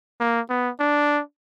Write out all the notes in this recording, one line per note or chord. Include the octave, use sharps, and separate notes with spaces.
A#3
B3
D4